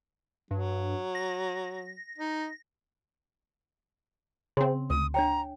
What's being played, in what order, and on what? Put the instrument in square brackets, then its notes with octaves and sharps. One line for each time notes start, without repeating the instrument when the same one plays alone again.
[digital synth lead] G2 [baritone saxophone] F#3
[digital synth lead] A#6
[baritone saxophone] D#4
[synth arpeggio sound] C#3 C4 [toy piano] C6
[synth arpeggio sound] D2 [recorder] D#6
[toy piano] D4 C#5 G5 [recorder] A#5